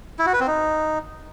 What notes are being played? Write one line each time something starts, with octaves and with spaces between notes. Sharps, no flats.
E4
F#4
B4
C4
D#4